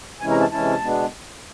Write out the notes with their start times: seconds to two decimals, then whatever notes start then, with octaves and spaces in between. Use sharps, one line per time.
0.21 C3 E3 G#3 C#4 E4 G#5
0.31 A#5
0.41 A5
0.51 C3 E3 G#3 C#4 E4 A5
0.81 B2 G#3 B3 D4